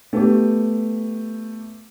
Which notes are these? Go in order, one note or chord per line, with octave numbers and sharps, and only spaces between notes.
A3 B3 G4